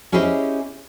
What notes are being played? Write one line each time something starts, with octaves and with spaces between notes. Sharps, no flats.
C#4 E4 G4 G#4 C5 D#5